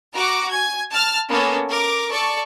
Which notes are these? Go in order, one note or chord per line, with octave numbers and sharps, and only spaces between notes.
F#4 A#5 D6
G#5 G#6
A5 F6
A#3 B3 C#4 A4
A#4 D6
A4 D5 C#6